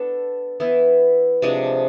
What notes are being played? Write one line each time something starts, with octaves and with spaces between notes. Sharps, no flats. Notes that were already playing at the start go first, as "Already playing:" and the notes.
Already playing: B3 D4 A4
E3 B3 E4
C3 F3 G#3 D4